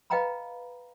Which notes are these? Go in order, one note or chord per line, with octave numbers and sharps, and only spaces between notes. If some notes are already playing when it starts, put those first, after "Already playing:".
B4 D#5 F5 G5 A#5 B5